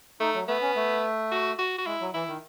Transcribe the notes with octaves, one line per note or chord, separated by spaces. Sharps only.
A3 D#4
F#3
A3 B3
C#4
A3
F#4
F#4
F#4
G#3 E4
F#3
E3 E4
D#3